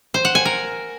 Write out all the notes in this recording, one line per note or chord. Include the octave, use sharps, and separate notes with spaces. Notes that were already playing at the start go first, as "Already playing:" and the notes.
C5
F#5
G#5
A#4